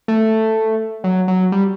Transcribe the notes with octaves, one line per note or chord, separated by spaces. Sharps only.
A3
F#3
F#3
G3